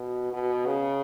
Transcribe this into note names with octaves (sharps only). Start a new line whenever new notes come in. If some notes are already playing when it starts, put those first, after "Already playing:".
Already playing: B2
B2
C#3